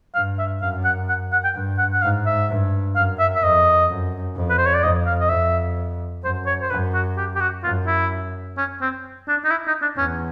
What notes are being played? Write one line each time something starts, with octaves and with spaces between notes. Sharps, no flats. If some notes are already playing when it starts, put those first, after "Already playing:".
G2 F5
E5
F#2 F5
F#5
F#5
F#5
G5
G2
F#5
F#5
G#2 F5
E5
G2
F#2 F5
E5
E5
F2 D#5
F#2
F2
B4
C5
C#5
D5
F2 D#5
F5
D#5
F2 E5
F#2 C5
C#5
C5
F#2 B4
F#4
G4
G4
F#4
F#2 F4
E4
C#4
C4
D4
D#4
E4
D#4
D4
E2 C#4